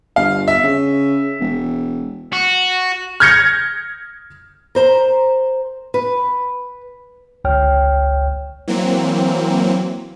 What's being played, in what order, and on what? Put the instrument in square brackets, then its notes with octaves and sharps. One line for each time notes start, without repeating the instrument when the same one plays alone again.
[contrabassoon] G1 [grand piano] F5
[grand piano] E5
[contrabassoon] C#3
E1
[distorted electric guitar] F#4
[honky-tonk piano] F6 G6 G#6 A#6 C#7
[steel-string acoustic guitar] A#4 C5 A#5
B4
[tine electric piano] G1 C#2 C#5 G5 F6
[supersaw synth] E3 F#3 A#3 C4